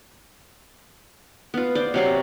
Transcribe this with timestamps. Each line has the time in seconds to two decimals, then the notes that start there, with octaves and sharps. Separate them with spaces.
1.54 B3 F4
1.75 C5 D5
1.94 C3 F#3 F5